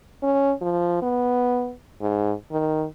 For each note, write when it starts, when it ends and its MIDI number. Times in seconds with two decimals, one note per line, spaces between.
0.23 0.53 61
0.61 1.01 53
1.02 1.73 59
2.01 2.34 44
2.51 2.85 51